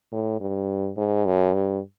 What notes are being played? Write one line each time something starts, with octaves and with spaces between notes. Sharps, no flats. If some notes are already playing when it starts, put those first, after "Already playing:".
A2
G2
G#2
F#2
G2